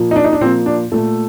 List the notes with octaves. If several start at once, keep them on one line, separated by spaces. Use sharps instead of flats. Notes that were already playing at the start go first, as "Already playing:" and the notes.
Already playing: A#2 F3 A#3
D#4
D4
D#4
D4
A#2 F3 A#3 C4
D4
A#2 A3 A4